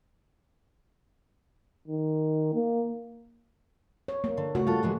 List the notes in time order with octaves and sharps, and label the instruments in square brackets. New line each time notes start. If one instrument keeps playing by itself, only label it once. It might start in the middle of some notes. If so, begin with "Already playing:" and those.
[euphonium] D#3
A#3
[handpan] C#5
A#3
[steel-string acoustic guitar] D3
[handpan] C#3 A3 F#4 [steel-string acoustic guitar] F#5
[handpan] G3 [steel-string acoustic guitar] F4 A4
[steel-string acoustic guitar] E3 G#3 F#4